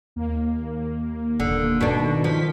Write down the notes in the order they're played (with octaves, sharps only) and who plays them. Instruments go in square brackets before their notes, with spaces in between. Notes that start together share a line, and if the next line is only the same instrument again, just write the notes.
[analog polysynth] D#2 A#3
[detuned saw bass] E1 [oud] D3
[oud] B2 D4 [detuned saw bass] D#3
[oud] F3 [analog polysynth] B6